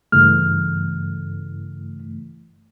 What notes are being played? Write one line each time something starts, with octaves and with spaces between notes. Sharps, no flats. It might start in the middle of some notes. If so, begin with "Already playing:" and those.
G2 C#3 E3 A3 F6